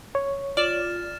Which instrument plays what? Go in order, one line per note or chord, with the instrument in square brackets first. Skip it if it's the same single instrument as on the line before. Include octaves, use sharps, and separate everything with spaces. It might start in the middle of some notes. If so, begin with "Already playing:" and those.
[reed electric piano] C#5
[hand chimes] F4 [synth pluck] D5 [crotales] F6 A6 E7